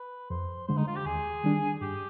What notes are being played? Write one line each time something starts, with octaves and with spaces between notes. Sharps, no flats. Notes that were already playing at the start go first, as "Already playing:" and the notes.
Already playing: B4
F2 C5
D3 G#3 C5
D#4
F4
G4
D#2 G#4
D#3 G3 D4
G2 G4